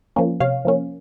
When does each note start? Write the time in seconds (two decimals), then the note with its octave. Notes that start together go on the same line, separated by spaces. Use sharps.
0.16 F3 A#3 C#4
0.40 C3 C#5 F5
0.65 F3 A#3 C#4